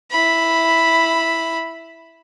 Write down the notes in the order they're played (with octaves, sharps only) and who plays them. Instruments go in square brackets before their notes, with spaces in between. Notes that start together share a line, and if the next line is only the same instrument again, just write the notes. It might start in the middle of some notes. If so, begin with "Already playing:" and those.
[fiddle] E4 B5